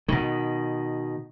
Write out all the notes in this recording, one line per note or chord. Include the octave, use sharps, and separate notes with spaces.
B2 D#3